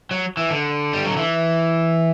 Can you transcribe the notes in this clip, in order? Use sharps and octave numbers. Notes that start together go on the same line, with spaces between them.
F#3
E3
D3
G3
F#3
E3